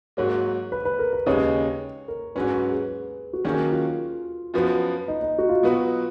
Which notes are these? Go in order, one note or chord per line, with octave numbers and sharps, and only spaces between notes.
G#2 F#3 A#3 C#5
B4
B4
A#4
B4
D#2 C#3 G#3 D#4 C#5
A#4
G#2 F#3 C#4 B4
B4
G#4
F#4
D#3 F#3 A#3 C#4 F#4 G#4
F4
F#2 F3 B3 F#4
D#4
D#4
F#4
F4
B2 F#3 B3 F#4 B4